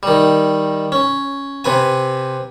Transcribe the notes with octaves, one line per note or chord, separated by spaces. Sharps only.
D#3 G3
C#4
C3 B4 G#5